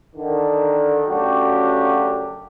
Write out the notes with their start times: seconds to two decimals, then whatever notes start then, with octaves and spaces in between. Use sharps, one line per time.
0.16 D3 D#3
1.07 F#2 C#3 A3 D4 F#4 G4